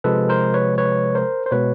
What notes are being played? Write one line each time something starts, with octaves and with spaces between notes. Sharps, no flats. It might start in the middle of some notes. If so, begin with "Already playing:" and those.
C3 F3 G#3 A4 B4
A#4 C5
B4 C#5
B4 C#5
A#4 C5
C5
B2 G#3 B4 C#5